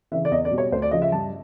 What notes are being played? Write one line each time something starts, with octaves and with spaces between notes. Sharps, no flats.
C#3 E3 E5
D5
E2 D#5
D5
B2 G3
C#5
D2 C5
D5
C#3 F3 D#5
E5
G2 A5